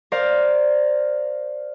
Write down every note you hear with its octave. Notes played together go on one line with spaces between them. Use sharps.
A#4 C5 D5 F5